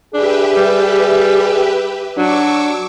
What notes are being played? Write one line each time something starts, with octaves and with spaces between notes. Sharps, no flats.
D4 G4 G#4 B4 E5
G3
F#3 D4 C#6 D6 E6